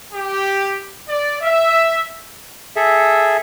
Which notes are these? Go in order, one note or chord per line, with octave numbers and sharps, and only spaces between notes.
G4
D5
E5
G#4 A4 E5